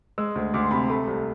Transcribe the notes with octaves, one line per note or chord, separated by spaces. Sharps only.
G#3 E6
D2
D2 D6
C6
C3 B5
A3 B5
C2